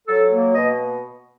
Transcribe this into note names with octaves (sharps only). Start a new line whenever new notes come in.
F#3 A4
A#3
B2 D#5